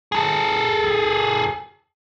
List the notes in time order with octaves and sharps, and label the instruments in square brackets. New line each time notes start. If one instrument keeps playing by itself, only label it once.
[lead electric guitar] G#4 A4